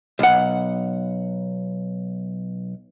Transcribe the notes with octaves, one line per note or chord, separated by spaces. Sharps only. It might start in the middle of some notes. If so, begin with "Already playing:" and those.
B1 F#5